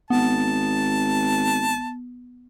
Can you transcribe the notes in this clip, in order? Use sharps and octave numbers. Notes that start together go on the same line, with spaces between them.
G#1 B3 A5